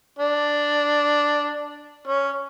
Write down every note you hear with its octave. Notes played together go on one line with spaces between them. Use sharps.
D4
C#4